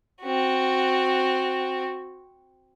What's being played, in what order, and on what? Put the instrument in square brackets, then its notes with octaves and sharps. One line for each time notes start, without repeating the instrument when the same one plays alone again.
[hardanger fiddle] C4 F#4